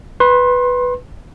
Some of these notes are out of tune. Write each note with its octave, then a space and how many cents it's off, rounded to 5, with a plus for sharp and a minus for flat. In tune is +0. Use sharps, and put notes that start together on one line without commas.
B4 +0 C6 +30